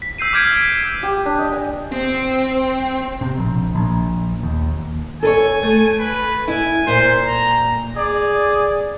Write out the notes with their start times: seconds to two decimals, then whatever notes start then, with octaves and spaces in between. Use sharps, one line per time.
0.02 B6
0.18 E6 G6 C7 D#7
0.33 D6 F6 G6 G#6 B6 D7
1.03 G4
1.25 D4
1.38 D#5
1.53 G#5
1.92 C4
3.21 C3
3.38 A#1
3.75 A#1
4.43 D#2
5.23 A4 B4 C#5 G#5
5.62 A3
6.00 B4
6.48 E4 G#5
6.87 A#2 C5
7.26 A#5
7.96 G#4 D5